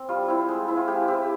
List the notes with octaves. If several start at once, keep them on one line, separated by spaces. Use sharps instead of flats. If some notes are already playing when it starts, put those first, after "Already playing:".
Already playing: C4
G3 F4
C4 E4
G#3
C4 E4
F4
G#3 G4
C4 E4 G4